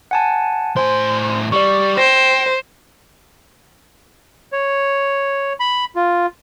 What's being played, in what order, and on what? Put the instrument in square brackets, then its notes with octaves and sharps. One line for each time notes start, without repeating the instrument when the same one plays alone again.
[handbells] F#5 G#5 A5
[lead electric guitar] A2 C6 [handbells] C5 G#5
[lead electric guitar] G3 [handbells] D5 C#6
[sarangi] C5 [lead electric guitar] G5 [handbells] A#6
[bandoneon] C#5
B5
F4